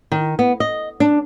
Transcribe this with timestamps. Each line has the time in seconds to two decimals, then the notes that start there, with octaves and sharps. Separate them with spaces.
0.12 D#3
0.39 B3
0.60 D#5
1.00 D4